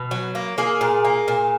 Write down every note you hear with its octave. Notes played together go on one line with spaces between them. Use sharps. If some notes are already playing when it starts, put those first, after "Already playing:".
Already playing: B2
F#3
A#3
A#3 G#4
A#2
A#3
A#2